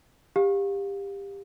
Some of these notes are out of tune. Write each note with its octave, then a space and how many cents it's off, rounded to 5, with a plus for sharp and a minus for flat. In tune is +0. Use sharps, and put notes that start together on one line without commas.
G4 +20 F5 +25